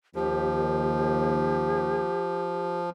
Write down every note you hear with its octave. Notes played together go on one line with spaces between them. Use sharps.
D#2 F3 G4